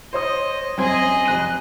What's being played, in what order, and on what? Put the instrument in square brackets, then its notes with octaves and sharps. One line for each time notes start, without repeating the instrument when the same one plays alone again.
[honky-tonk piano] C5 C#5 D#6 [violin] D#5
[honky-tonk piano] F#2 C4 G#6 [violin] G#4 D#5
[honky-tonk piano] F1 F#6 D#7